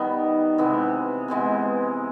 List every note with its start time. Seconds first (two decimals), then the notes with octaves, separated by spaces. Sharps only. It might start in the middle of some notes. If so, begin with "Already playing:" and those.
Already playing: D#3 G3 B3
0.58 C3 E3 G#3 B3
1.28 C3 E3 G#3 B3